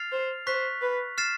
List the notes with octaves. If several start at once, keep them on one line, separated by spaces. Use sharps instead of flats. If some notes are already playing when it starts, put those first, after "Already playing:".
Already playing: F6 A6 C7 F7
C5
C5 C#6 F#6 B6
B4
F6 A6 C7 E7